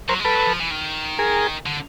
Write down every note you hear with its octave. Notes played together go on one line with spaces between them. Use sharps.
F#3 A#4 C5
G#3
G3 A4 B4
F#3
F3
E3
D#3
G#4 A#4
D3